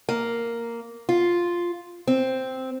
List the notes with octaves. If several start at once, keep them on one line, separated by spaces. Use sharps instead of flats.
A#3
F4
C4